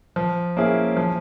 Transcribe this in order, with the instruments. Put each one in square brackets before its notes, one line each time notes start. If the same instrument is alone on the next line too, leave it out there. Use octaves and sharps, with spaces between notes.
[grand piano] F3
A#3 C#4 E4 G#4
F3